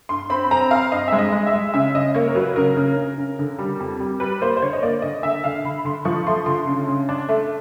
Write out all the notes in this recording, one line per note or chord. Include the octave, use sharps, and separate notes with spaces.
G2 C6
C4 B5
C4 A#5
C4 F5
G2 D#5
G#3 E5
D#5
G#3
E5
G#3
C#3 E5
C#3 D#5
A#3 C#5
A#4
F#3 B4
C#3 A#4
C#3
C#3
C#3
D3
G3
F2
G3
G3 B4
A#3 C5
C5
D3 C#5
D#5
A#3 D5
D3 D#5
D3 E5
D3 F5
D3 B5
D3 C6
F3 C#6
A3 C6
D3 C6
C#3
C#3
D4
A3